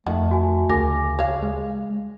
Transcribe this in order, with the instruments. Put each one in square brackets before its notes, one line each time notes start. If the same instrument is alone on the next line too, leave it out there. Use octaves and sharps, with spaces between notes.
[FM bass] F2 [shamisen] D#3 F#5 [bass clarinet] A3
[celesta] F#4 G#5
[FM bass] D2 [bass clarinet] C#3 [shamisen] A#4 [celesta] G#5 D6 A#6
[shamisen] C#5 F5
[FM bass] G#3